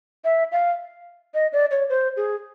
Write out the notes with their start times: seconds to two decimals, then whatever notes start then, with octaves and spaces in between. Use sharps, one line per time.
0.24 E5
0.52 F5
1.34 D#5
1.53 D5
1.71 C#5
1.89 C5
2.17 G#4